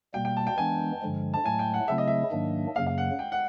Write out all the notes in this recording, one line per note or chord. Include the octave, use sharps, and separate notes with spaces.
B2 G3 A#3 G5
G5
A5
G5
E3 G#3 B3 D4 G#5
G2 D3 F3 G#3
A5
A2 F#3 A3 G#5
G5
F#5
C#3 F#3 A3 C4 E4 E5
D#5
E5
G#2 D#3 F#3 A#3 D4
F#2 C#3 F#3 A#3 F5
F5
F#5
G5
F#5